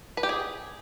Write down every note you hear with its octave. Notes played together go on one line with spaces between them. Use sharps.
B4
G4
G#4